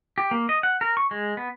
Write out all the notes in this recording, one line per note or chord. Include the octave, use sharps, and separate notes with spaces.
G4
A#3
D#5
F#5
A#4
C#6
G#3
B3